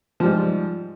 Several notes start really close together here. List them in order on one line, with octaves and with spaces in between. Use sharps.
F3 G3 G#2